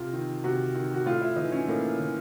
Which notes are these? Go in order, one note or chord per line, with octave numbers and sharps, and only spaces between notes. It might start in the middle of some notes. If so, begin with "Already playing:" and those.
Already playing: C3 F4
D#3
C3 F#4
D#3
F#4
A2 F4
E4
E3 D#4
C#4
A2 A#3
E3